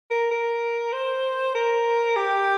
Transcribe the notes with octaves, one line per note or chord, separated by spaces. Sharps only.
A#4
A#4
C5
A#4
G4